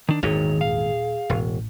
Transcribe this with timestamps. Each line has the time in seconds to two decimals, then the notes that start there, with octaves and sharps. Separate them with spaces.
0.09 D#3 D4
0.23 G#1 E2 A#2 D#3 G#4 C#5
0.61 D#1 F5
1.30 E1 A1